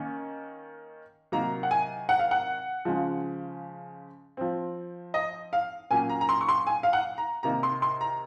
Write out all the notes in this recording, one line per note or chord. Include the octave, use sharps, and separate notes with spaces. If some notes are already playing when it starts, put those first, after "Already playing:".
Already playing: D#3 A#3 C#4
C3 D#3 F#3 A#3 A#5
F#5
G#5
F#5
F5
F#5
C#3 F3 G#3
F3 C4
D#5
F5
A#2 F#3 A#3 C#4 G#5
A#5
A#5
C6
C#6
C6
G#5
F5
F#5
A#5
C3 D#3 A#3 A#5
C6
C6
A#5